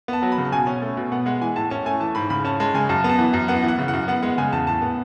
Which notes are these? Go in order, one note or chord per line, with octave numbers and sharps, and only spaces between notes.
B3 A5
F#3
B5
C#3
A5
B2 G#5
C#4
A3
B2
B3 F#5
G#3 F#5
E3 G#5
A2 A5
C#4 A5
A3 G#5
E3 A5
G#2 B5
C#3 B5
C#4 A5
G#3 A5
C#3 G#5
F#2 A5
B3 A5
E3
F#2
B3 F#5
E3 F#5
C#3
F#5
F#2
B3 F#5
G#3 F#5
C#3 G#5
E2 A5
A2 A5
B3